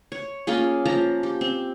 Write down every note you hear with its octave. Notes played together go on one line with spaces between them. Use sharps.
C#5
A#3 C#4 F4 G#4
F3 A#3 A5 A#5
G4
C4